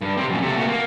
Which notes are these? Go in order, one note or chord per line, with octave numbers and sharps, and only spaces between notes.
G2
C3 C4
F#2 A#2
C3 A3
A#2 F#4
A#3